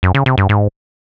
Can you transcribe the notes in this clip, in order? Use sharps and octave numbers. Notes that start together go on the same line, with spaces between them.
F#2
C#3
C3
G2
G#2